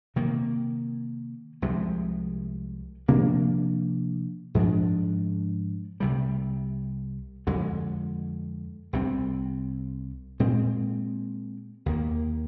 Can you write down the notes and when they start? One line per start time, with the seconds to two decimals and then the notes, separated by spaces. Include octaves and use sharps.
0.16 C3 D#3 A#3
1.62 C2 C3 F3 G#3
3.08 C3 F3 A#3 D4
4.55 G#2 F3 G#3 D4
6.00 C2 C3 G3
7.47 F2 D3 G#3
8.93 C2 C3 G3 C4
10.40 A#2 G#3 C4
11.86 D#2 D#3 A#3